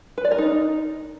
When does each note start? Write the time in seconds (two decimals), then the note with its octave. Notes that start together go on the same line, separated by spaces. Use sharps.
0.18 B4
0.25 D5
0.31 A#4
0.38 D#4